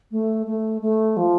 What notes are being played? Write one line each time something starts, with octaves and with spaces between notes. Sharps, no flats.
A3
A3
A3
F3